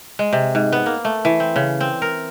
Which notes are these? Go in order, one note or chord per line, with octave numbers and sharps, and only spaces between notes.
G#3
C3
G#2
B3
A#3
A3
E3
C4
C#3
C4
A#4